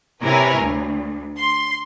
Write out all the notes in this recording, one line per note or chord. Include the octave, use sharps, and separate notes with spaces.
C3 E4 A#4 B4 C#5 G#5
D2
C6